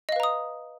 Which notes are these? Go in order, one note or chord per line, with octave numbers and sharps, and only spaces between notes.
B4 D#5 F5 A#5 D#6